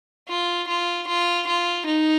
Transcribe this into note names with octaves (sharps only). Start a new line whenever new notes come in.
F4
F4
F4
F4
D#4